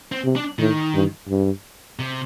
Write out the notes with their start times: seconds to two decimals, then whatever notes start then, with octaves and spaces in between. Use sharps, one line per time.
0.12 C4
0.24 C3
0.36 D4
0.59 A2 D#3
0.94 G2
1.29 G2
1.99 C3